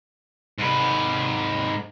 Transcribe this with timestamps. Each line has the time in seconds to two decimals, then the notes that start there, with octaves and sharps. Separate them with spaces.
0.58 G#2 B4